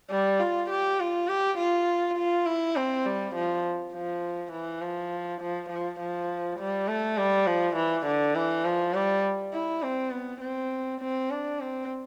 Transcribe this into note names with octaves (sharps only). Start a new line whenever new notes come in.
G3
F4
G4
F4
G4
F4
F4
E4
C4
G3
F3
F3
E3
F3
F3
F3
F3
G3
A3
G3
F3
E3
D3
E3
F3
G3
E4
C4
B3
C4
C4
D4
C4